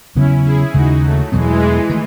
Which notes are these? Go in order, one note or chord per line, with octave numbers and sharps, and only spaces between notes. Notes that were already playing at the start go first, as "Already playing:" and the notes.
E2 C#3 F#3 B3 C#4 E4
E4 G#4
D#2 C#3 G#3 D#4 F#4
F#3 A3
E2 B2 E3 F#3 G#3 B3
D#3 A3